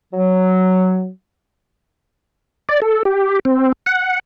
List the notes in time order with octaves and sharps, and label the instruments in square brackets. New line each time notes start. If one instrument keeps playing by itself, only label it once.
[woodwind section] F#3
[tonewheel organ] D5
A4
G4
C4
F#5